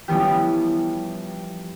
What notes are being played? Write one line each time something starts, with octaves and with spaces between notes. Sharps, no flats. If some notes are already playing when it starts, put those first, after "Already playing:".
E3 F3 G3 B3 C#4 G4